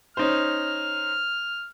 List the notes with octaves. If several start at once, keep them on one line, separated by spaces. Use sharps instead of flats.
C#4 D#4 C5 F6